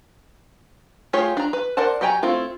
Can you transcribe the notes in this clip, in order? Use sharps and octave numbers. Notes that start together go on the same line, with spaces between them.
A3 F4 G4 G#4 C#5
D4 A#5
B4
A#4 C5 D5 F#5 A5
F#3 G4 G5 G#5 A#5
A3 C4 E4 F4